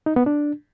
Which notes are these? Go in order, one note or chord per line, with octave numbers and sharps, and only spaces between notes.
D#4
B3
D4